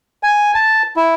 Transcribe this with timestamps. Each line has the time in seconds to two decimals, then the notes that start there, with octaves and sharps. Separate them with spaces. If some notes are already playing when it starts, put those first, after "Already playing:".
0.23 G#5
0.55 A5
0.96 E4